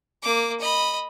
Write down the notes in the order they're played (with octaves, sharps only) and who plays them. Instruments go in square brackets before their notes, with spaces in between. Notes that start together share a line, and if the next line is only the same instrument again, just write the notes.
[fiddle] A#3 D6
D#5 B5